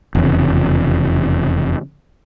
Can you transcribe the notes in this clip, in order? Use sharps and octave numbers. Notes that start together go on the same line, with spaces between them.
F1 E2 C#3